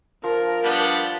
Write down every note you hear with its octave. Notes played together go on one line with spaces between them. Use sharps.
F3 A#4
G3 B3 D4